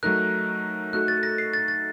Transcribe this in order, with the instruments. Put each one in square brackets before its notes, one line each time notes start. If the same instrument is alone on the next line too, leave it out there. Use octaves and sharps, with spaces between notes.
[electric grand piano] F#3 A3 D#4 A#4 [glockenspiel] F#6
[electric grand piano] A3 D#4 F#4 A4 [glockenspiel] F#6
[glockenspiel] A6
A#6
C7
A6
A6